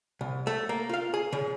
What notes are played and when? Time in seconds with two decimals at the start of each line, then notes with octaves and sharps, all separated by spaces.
0.21 C2
0.47 A3
0.69 A#3
0.89 F4 F5
1.14 G#4
1.33 C#3